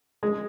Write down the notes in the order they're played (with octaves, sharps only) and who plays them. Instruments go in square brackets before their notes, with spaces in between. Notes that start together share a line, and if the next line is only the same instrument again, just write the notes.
[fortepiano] G#3